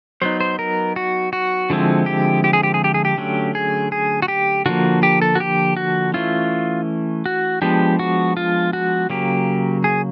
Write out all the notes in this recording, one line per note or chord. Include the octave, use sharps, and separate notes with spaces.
F#3 B3 D#4 C5
C5
A#4
F#4
F#4
D3 F3 G#3 C4 E4
G4
G4
G#4
G4
G#4
G4
G#4
G4
D3 F#3 A3 C#4
G#4
G#4
F#4
G4
D3 F3 A#3 F#4
G4
A4
F#4
G4
F#4
E3 A3 C#4 E4 F4
F#4
F3 G#3 B3 D4 G4
F#4
F4
F#4
C#3 F#3 A#3 G4
G#4